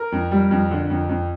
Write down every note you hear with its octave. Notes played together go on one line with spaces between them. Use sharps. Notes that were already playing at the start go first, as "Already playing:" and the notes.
Already playing: A#4
F2
G3
F2
D3
F2
F2